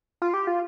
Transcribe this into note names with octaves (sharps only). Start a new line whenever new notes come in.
F4
G4
F4